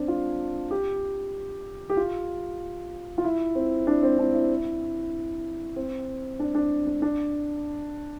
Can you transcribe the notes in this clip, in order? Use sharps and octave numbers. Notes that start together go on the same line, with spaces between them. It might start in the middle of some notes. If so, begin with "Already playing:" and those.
Already playing: C4 D4
F4
G4
G4
F4
F4
E4
C4
D4
C4
D4
E4
C4
D4
D4
D4
D4